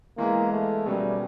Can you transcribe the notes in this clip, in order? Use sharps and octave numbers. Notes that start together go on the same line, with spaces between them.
E3 G#3 A#3 B3 E4 G#4
A3
B2 F#3 G3 A#3 C#4